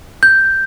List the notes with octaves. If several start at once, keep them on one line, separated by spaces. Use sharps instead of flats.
G6